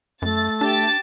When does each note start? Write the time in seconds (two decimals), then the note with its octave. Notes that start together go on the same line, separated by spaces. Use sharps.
0.22 F#2 A3 A6
0.61 D4 G4 A5 A6